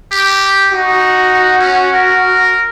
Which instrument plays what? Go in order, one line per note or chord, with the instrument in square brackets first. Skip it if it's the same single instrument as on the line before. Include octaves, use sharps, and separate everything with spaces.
[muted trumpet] G4
[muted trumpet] D#4 [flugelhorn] F#4
[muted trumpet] C#4
A#4